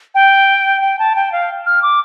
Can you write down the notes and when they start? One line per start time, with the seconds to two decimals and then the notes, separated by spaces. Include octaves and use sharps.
0.15 G5
0.81 G5
0.99 A5
1.16 G5
1.32 F5
1.66 F6
1.82 D6